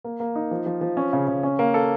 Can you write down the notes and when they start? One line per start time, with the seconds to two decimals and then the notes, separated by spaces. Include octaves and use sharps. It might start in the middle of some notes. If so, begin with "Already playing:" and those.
0.04 A#3
0.20 A#3
0.35 D#4
0.51 F3
0.66 F3
0.81 F3
0.97 C#4
1.13 C#3
1.28 C#3
1.43 C#4
1.59 A#3
1.74 A4